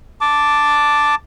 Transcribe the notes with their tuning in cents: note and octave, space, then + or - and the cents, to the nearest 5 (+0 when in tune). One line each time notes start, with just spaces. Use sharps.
A5 +0 D6 +0